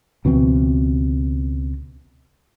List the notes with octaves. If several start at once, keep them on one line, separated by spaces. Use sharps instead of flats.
C#2 B2 E3 C4